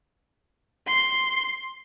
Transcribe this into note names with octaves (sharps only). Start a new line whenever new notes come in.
C6